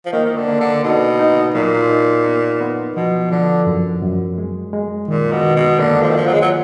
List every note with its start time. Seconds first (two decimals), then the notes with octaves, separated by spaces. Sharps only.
0.06 F3
0.13 D#3 A#3
0.25 D#3
0.37 D3
0.48 A#3
0.61 D3
0.83 B2 D#4
1.19 D#4
1.54 A#2 F#3
1.90 D#4
2.26 B3
2.61 B3
2.96 B2 F3
3.31 D3 F3
3.67 F#2
4.02 F#2
4.38 G#3
4.73 G#3
5.08 A#2 D#3
5.32 B2
5.44 D#3
5.56 B2
5.79 D3 A#3
6.02 F3
6.10 D#3
6.14 F3 F4
6.27 F#3
6.33 G#3
6.42 F#3